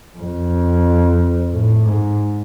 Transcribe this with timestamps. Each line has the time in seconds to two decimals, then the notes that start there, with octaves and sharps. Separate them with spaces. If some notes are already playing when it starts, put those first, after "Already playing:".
0.18 F2
1.53 A2
1.86 G#2